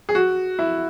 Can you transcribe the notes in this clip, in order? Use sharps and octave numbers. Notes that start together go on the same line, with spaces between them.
G#4
F#4
E4